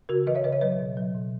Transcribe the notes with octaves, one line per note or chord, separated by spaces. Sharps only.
C#3 F#4 A#4
E3 B4 D#5
C#5 E5
C#3 B4 D#5
C#5 E5
F#3 B4 D#5
B2
F#3
B2